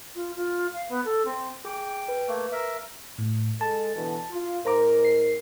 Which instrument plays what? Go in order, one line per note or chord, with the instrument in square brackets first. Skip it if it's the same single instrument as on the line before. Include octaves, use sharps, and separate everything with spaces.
[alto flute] F4
F4
F5
B3
A4
C4
[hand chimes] G#4 D6 [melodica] G5
[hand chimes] B4
[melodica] A3 A#3
A#4 E5
[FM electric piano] A2
[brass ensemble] G#3 A4 [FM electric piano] A5
[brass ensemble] B2 D3 E3
F4
[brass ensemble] G#2 A#4 [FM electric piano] C5 A#5 D6
[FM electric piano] C7